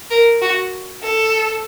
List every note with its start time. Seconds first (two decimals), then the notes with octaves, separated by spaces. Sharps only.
0.11 A#4
0.42 F#4
1.02 A4